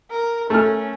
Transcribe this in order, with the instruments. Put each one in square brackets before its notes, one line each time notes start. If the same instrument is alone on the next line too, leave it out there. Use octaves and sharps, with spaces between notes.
[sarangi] A#4
[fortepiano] A3 F6 [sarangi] C#4